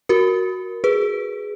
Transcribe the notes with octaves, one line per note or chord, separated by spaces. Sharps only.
F#4 A#4
G#4 B4